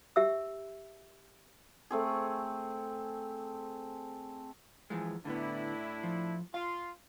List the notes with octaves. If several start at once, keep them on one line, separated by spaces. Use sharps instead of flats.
G4 E5 E6
A3 C4 G#4
E3 F3 G#3
A2 D3 B3 D4 E4
F3
F4 F5 C6